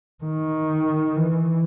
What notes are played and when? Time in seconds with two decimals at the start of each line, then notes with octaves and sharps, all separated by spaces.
0.24 D#3
1.16 E3